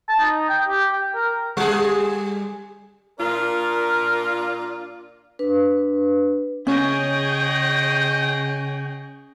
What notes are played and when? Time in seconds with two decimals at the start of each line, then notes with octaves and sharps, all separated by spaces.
0.08 A5
0.20 D#4
0.49 G5
0.68 G4
0.93 G5
1.15 A#4
1.57 G3 G#4
3.20 A#2 D4 F4 A#4
5.39 D4 B4
6.67 C#3 C#4 G#4 C#5 D#5 G5